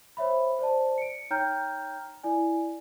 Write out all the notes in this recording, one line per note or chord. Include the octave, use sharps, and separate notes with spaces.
C5 C#5 E5 B5
C5 D5 A5
C#7 D7
D#4 C#5 G5 A#5 F6 G6
E4 D5 G#5